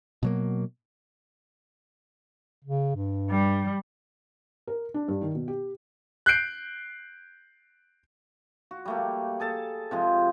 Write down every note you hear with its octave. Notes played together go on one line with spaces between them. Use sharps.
B2 F#3 A#3
C#3
G2
G3
A#4
D4
G2
D#3
B2
G4
F#6 G6 C7 D7
F#4
G3 A3 A#3
G#4 A4 A5
C3 F3 G#3